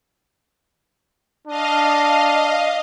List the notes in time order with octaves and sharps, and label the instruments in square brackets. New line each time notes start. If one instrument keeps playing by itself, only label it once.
[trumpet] D4 [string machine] D#5 F5